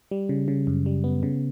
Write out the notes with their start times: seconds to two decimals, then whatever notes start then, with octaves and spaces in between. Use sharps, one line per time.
0.11 G3
0.29 C#3
0.48 C#3
0.67 F#2
0.86 G3
1.04 B3
1.23 C#3